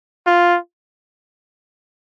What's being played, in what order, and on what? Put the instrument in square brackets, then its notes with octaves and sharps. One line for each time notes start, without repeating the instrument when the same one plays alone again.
[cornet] F4